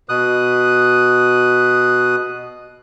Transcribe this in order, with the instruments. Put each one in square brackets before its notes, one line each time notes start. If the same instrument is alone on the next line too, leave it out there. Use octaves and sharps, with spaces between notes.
[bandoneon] B2 D#6 F#6